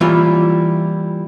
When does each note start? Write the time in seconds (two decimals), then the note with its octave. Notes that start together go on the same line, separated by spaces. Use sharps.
0.01 E3 G3 A#3 E4 F4 C#5